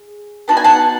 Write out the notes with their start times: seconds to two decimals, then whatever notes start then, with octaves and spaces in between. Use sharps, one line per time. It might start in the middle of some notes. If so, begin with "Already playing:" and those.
Already playing: G#4
0.48 B3 D#4 F#4 A5
0.57 G#5
0.64 F#5 A5